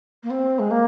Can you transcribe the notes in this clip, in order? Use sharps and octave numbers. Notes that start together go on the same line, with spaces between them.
A#3
C4
G#3
A#3